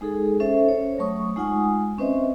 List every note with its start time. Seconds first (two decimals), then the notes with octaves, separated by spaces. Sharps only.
0.01 G#3 D#4 G#4 A4
0.40 C#4 A4 C5 E5
0.68 C5 C#5
0.98 F#3 A3 C#6 D#6
1.36 G#3 D#4 F4 F#5 G#5 D#6
1.98 C4 C#4 B4 C5 D#5 E5